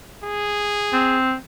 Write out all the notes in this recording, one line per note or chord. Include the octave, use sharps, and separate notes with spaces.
G#4
C4